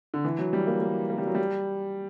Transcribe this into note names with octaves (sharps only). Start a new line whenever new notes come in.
D3
E3
F#3
G3
A#3
A#3
A#3
G3
F#3
G3